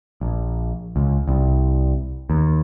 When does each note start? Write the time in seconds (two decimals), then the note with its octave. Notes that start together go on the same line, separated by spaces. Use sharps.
0.21 A#1
0.96 C#2
1.28 C2
2.30 D#2